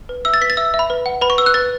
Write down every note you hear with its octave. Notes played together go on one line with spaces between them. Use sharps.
B4
E5 E6
A6
B4 B6
A6
E5 E6
E5
B5
B4
F#5
B4 B5
C#6
B4 E6
F#6
B4 A6